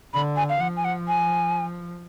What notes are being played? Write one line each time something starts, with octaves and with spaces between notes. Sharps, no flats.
D3 B5
G#5
F5
F3 F#5
G#5
F#5
G#5